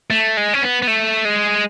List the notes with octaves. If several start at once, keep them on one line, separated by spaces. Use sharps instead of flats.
A3
G#3
C#4
B3
B3
A3
G#3